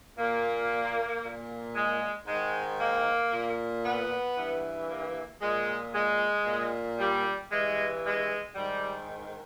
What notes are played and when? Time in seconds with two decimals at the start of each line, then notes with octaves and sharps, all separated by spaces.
0.18 A#2 A#3
1.23 A#2
1.76 G#3
2.27 G#2 D#3 G#3
2.80 A#3
3.32 A#2
3.85 B3
4.37 G2 E3
4.89 A#3
5.41 A#2 G#3
5.95 G#3
6.47 A#2
6.99 G3
7.51 G2 E3 G#3
8.04 G#3
8.56 G#2 D#3 G3